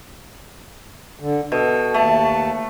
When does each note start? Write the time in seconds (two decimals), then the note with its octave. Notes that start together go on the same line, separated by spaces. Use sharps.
1.20 D3
1.52 B2 A4
1.94 D#2 A3 A5